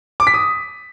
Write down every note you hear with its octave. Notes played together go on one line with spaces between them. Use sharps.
D6
B6
D#6